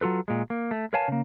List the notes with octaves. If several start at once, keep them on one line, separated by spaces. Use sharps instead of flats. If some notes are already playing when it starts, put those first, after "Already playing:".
F#3 F4 A4 B4
A#2 G#3
A#3
A3
A#4 B4 C#5 F5 G#5 A5
C#3 A#3